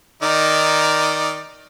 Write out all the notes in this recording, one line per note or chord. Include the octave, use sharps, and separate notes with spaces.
D#3 D#4 D5